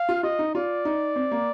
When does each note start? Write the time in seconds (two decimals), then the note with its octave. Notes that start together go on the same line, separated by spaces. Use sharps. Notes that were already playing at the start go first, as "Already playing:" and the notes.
Already playing: F5
0.09 F4
0.23 F4 D#5
0.39 D#4
0.55 F4 D5
0.85 D#4
1.16 C4
1.32 A#3